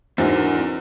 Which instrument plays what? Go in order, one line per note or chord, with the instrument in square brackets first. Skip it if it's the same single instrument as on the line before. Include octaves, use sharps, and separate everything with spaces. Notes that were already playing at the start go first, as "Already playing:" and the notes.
[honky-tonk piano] E2 G#2 [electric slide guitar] C4 D4 A#4 [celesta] E4 F#4 C5